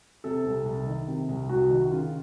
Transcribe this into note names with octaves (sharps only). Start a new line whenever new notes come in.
C3 A4
C2
C2
D#3
C3
C2
C2 F#4
D#3
C#3 F4